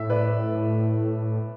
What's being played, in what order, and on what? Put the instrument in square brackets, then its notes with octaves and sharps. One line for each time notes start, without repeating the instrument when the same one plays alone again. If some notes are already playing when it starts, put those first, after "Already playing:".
Already playing: [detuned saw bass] A2 [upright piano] E5
[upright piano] B4 D5